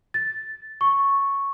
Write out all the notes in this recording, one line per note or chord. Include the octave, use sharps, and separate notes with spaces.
A6
C#6